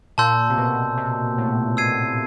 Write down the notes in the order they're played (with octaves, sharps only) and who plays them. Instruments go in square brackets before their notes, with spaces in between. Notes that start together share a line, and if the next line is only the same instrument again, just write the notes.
[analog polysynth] A#2 [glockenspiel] A5 C6 E6 G6
[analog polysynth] C3
B2
C3
A2
[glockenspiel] E6 G#6 C7 D#7